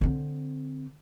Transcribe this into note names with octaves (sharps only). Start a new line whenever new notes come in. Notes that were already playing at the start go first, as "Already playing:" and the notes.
D3 C4